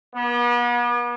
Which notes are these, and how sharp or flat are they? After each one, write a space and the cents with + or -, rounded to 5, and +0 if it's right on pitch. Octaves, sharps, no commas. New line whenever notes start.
B3 -40